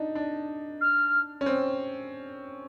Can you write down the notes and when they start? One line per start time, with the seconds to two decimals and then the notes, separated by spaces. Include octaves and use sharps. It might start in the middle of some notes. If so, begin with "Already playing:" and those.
Already playing: D4 D#4
0.15 D4
0.81 F6
1.41 C#4
1.46 C4